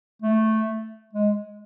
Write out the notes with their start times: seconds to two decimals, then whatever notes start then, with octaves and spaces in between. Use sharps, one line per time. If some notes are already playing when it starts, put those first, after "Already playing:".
0.22 A3
1.13 G#3